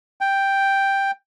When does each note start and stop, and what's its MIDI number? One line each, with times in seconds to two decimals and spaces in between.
0.21 1.11 79